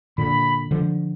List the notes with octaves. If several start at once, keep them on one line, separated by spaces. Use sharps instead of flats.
A#2 D3 B5
D3 F3